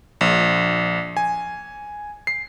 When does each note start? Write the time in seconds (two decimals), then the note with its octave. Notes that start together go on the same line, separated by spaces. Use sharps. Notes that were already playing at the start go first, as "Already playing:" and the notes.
0.21 A#1
1.17 G#5
2.27 C7